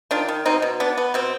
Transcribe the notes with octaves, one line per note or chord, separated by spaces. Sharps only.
D#3 D4 F4
D#3
B2 C4 D#4
B2
B3 D4
B3
B2 C4